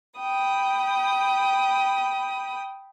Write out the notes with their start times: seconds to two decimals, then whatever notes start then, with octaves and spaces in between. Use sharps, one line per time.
0.18 G5 B5 D#6